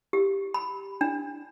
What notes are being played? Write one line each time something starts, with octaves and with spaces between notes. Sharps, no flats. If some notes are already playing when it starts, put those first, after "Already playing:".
G4
B5
D4